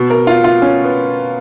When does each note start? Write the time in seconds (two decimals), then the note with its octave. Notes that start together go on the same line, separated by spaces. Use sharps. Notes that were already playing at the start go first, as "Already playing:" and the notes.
Already playing: B2
0.10 A#4
0.27 F4
0.44 F4
0.62 C#4
0.84 B3